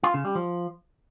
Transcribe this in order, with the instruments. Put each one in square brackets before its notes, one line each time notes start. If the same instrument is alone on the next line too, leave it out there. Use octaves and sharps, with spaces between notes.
[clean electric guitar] F4
C#3
G3
F3